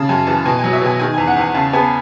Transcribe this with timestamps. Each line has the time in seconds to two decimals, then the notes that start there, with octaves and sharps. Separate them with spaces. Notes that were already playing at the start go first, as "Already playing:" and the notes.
Already playing: C#3 A5
0.09 F#2 G#5
0.27 E3 A5
0.45 B2 G#5
0.59 G#5
0.64 F#3
0.73 E5
0.81 B2 G#5
0.99 D#3 G#5
1.14 E2 G#5
1.27 F#5
1.37 E2 G#5
1.54 C#3 A5
1.73 B3 G#5